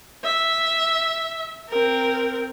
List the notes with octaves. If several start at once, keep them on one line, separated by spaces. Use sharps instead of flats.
E5
C4 A#4